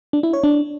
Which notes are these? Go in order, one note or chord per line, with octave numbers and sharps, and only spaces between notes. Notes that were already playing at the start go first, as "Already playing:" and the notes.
D4
E4
C#5
D4